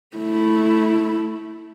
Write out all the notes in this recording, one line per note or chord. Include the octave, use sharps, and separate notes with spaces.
A3 E4